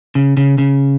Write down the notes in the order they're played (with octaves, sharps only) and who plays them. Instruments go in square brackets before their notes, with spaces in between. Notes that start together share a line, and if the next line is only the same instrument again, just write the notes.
[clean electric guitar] C#3
C#3
C#3